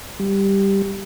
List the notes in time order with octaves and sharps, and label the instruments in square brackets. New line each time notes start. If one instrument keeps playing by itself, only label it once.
[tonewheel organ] G3